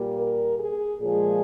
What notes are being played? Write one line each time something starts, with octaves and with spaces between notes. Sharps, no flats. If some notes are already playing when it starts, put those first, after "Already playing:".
Already playing: A#2 G3 A#3
A#4
G#4
A#2 F3 G#3 G#4